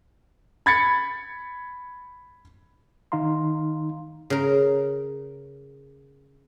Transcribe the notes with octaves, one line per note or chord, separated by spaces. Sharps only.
B5 G#6 A6 C#7
D#3 D#4 F5 A#5 C6
C#3 A#4